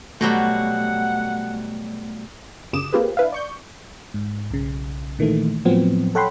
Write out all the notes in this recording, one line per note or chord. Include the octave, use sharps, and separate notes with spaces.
B2 F#3 G3 A3 F#5
G1 F#2 C#3 D6 D#6 E7
A#3 C4 F4 G4 G#4 B4
D4 E4 B4 E5 F5
D5 C#6 G6
G#2
B1 C#3
A#2 D#3 E3 A3
A2 F3 F#3 B3 C4
A4 C#5 F#5 G5 B5 C6